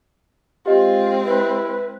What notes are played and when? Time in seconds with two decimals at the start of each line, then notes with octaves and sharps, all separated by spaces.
0.66 G#3 C4 F4 G4 D#5
1.25 E4 B4